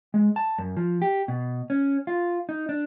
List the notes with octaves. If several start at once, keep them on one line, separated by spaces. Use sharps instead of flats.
G#3
A5
F#2
F3
G4
B2
C#4
F4
D#4
D4